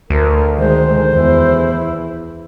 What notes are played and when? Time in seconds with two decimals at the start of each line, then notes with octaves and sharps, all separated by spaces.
0.10 D2 A#4
0.57 D#3 G#3 C5
1.13 E2 E4